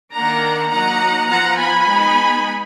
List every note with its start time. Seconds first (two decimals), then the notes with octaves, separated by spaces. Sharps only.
0.14 D#3 A#3 D4 F#5 A#5
0.71 F#3 A#3 D#4 F#5 A#5
1.29 F3 B3 F4 F#5 A#5
1.58 G#5 B5
1.87 G#3 B3 D#4